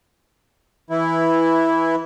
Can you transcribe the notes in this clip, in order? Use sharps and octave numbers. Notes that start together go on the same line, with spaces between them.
E3 E4